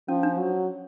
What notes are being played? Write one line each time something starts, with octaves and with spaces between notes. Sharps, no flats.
F3 C#4
D4
F#3